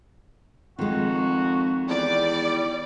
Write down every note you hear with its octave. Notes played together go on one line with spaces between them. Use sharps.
F2 D#3 G#3 F#4
E2 G3 D5